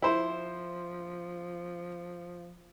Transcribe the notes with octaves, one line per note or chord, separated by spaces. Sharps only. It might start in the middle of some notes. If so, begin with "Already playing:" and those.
F3 E4 C5